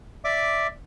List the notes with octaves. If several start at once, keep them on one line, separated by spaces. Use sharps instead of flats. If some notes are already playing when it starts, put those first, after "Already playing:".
D5 E5 D6